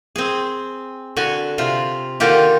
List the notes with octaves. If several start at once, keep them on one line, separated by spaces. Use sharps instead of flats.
C4 G#4
D3 F#4 G#5
C3 F4
D3 D#3 A#3 F4 G4